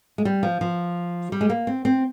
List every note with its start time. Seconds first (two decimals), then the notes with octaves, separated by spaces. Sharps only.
0.18 G#3
0.25 G3
0.43 F3
0.61 F3
1.32 G3
1.41 G#3
1.50 A#3
1.67 C4
1.85 C4